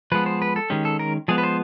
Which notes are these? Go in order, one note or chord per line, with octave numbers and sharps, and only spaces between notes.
F3 G#3 B3 B4
C5
B4
A4
D#3 G#3 C#4 G4
A4
A#4
F3 G#3 B3 G#4
B4
C5